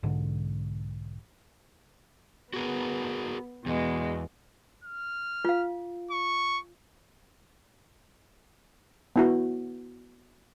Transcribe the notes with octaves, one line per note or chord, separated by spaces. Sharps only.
B1 G#2 D3
B3 F#4 G#4 A#4
E2 B2 G#3
F6
F4 F5
C#6
B3 E4 F#4